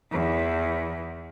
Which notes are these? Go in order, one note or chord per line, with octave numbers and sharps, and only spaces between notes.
E2